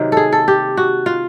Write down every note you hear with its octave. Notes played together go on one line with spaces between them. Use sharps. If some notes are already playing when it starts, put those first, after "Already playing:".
Already playing: C3 D#3 F#3 A#3
G#4 A4
A4
G4
F#4
F4